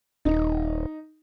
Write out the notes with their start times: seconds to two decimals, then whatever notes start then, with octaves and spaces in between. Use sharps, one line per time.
0.25 D#1 D#4